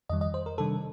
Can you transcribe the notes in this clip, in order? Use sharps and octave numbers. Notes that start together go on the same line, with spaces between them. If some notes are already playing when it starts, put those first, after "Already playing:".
F2 D#3 G3 D#5
D#5
C5
A#4
C3 D#3 G3 D4 A4